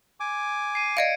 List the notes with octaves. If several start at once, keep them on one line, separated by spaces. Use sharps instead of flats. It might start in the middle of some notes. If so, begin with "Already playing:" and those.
G#5 D6
C7 D#7
D5 D#5 F5 G#6 C#7 D7